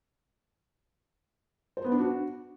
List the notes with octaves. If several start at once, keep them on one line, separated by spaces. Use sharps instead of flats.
C5
B3
D4
F#4